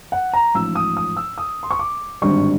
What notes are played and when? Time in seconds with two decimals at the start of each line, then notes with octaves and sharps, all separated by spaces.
0.12 F#5
0.34 A#5
0.54 A1 G#2 F3 E6
0.75 D#6
0.97 D#6
1.17 E6
1.38 D#6
1.63 C6
1.71 C#6
1.79 D6
2.22 G#1 G2 D3 G3 C#6